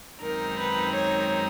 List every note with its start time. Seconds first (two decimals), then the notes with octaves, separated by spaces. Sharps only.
0.22 F#2 D#3 G#3 C4 D#4 A#4
0.58 B4
0.94 C#5